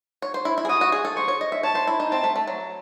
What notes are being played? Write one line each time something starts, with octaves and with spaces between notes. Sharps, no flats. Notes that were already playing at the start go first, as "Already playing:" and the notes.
C#5
C5
E4
E4
G#4
F#4 D#6
F#4
G#4
A4
C5 C#6
C#5
D#5
E5
C#5 A5
C5
E4
D#4
C4 A5
A3
A3
F#3